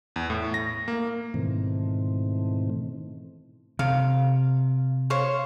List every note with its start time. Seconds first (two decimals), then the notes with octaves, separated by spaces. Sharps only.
0.16 E2
0.30 A2
0.54 A#6
0.88 A#3
1.34 G#2 B2 D#3 E3 A3 C4
3.79 C3 F5
5.10 C5 C#5 F5